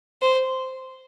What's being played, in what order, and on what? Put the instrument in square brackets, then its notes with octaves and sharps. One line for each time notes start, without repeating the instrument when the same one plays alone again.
[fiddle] C5